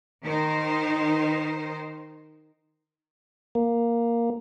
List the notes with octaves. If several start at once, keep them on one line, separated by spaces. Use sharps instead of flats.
D#3 D#4 C5
A#3